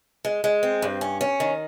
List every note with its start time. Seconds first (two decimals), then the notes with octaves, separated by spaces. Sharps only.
0.25 G#3
0.44 G#3
0.63 C4
0.82 G2
1.01 C#4
1.21 C#4
1.40 D#3